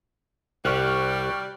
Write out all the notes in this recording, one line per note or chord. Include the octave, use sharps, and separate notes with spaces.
C2 G3 G4 C#6 F6 F#6